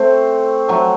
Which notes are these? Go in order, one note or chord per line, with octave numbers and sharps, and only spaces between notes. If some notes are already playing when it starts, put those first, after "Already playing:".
Already playing: A3 C4
F#3 A3